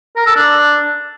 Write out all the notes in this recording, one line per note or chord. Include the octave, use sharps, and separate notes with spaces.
A#4
A4
D4